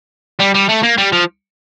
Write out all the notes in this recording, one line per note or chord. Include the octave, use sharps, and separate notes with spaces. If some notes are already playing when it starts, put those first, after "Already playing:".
G3
G3
A3
A#3
G3
F3